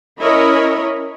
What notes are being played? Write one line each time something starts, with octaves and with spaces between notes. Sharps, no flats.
C#4 E4 A#4 C#5 D#5 B5